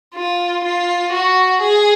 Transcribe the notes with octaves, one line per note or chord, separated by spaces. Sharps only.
F4
F4
F#4
G#4